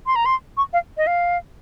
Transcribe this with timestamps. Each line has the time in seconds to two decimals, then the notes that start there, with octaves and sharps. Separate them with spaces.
0.06 C6
0.16 A#5
0.25 C6
0.57 C#6
0.73 F5
0.97 D#5
1.07 F5